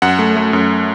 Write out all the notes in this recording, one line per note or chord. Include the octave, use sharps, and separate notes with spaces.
F#2 F#5
A3
A3
F#2